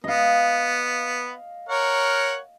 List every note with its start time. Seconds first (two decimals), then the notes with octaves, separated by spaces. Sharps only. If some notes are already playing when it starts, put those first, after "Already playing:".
0.04 B3 D#5 F5
1.69 A#4 C#5 F#5